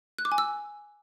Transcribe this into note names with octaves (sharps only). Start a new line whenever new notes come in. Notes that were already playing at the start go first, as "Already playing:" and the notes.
F#6
D6
G#5
E6